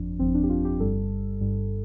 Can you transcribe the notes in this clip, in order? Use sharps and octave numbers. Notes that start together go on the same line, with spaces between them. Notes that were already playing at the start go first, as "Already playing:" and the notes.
Already playing: G1 F2 F3 D4
G1 F2 F3 C4
D4
G4
F4
G4
G1 G2 G3 A4
G1 G2 G3